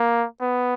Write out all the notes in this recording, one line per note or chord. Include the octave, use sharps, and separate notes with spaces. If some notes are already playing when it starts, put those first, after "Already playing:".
Already playing: A#3
B3